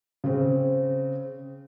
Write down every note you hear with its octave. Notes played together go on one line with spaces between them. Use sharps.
C#3 C4